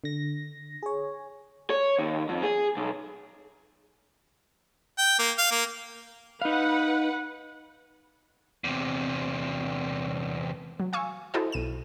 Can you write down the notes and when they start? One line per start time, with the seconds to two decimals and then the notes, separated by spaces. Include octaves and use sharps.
0.04 D3 A#6
0.83 G#4 C#5
1.70 C#5
1.99 D#2
2.29 F2
2.43 G#4
2.77 B1
4.98 G5
5.19 A#3
5.38 F5
5.51 A#3
6.42 D#4 B4 F5 F#5
8.64 E2 C3
10.80 F#3
10.93 F5 G#5 C#6 E6
11.34 E4 F#4 A4 C5 D#5
11.52 B1 D#7 E7